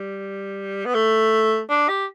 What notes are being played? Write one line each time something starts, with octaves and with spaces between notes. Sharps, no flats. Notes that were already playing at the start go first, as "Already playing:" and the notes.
Already playing: G3
B3
A3
D4
G4